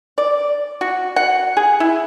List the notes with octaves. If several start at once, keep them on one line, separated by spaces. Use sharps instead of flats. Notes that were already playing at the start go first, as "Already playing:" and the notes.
D5
F#4
F#5
G#4
E4